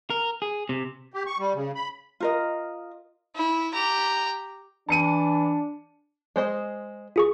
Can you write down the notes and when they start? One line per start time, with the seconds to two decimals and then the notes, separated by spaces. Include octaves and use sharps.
0.10 A#4
0.42 G#4
0.69 C3
1.14 G4
1.26 C#6
1.38 G3
1.55 C#3
1.75 B5
2.20 F4 A#4 D#5
3.35 E4
3.73 G4 A#5
4.89 E3 D4 A5 C#7 D#7
6.36 G#3 C5 D#5
7.16 F4 G#4 C#6